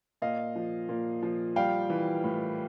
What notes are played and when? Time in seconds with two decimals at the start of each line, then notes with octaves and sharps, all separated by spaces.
0.22 A#2 D#5 F5
0.56 F3
0.89 A#2
1.23 F3
1.56 G3 F5 G5
1.90 E3
2.24 A2